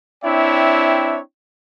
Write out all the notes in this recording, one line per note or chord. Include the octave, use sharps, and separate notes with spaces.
C4 D4 E4 C#5 E5 G5